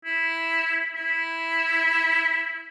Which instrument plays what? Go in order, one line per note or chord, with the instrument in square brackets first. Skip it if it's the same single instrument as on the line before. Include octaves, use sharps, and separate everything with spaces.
[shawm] E4
E4